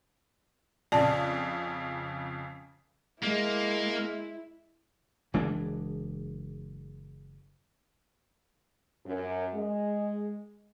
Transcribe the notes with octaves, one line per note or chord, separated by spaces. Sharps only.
F2 C#3 D5 A5
G#3 A#3 E4
F#1 E3 G#3 D4
F#2
G#3